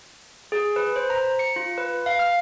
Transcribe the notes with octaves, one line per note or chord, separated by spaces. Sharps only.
G#4
B4
C5
A#5
C#7
F4
B4
F5
F6